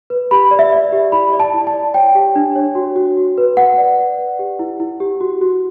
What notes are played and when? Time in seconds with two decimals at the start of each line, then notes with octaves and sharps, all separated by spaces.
0.10 B4
0.31 G4 B5
0.51 D5
0.59 E5
0.72 D5
0.92 G4
1.12 E4 B5
1.33 D5
1.40 A5
1.53 E4
1.67 A5
1.74 D5
1.94 C#5 G5
2.15 G4
2.36 D4
2.56 C#5
2.75 F#4
2.96 F#4
3.17 F#4
3.38 B4
3.57 B4 F#5
3.78 D5
3.98 D5
4.19 B4
4.39 G4
4.59 E4
4.80 E4
5.00 G4
5.21 F#4
5.41 F#4